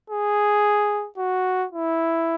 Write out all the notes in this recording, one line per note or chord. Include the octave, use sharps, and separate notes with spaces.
G#4
F#4
E4